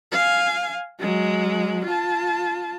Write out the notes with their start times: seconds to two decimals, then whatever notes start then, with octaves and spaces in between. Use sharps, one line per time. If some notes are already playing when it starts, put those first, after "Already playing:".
0.12 F5 G#5
1.01 F#3 G#3
1.85 F4 A5